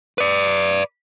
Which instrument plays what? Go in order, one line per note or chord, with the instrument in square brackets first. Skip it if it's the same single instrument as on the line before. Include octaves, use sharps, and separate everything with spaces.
[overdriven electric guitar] B4 D5